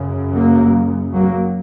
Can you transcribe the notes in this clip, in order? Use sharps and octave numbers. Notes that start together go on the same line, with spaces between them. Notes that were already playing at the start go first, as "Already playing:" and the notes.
Already playing: F#2 C#3
F#3 A#3
F#3 A#3